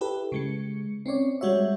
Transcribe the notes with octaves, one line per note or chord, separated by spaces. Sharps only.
E4 G4 A4 B4
C#3 G#3 C#7
C4 C#4 C#5 D5
G3 G#3 F#4 C#5 E5